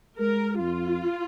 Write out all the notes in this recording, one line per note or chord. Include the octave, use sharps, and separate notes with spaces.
G#3 A#4
F2 F4